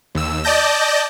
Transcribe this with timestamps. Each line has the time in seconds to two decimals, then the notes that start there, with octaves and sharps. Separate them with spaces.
0.15 D#2 E6
0.44 D5 D#5 A5 G6 A#6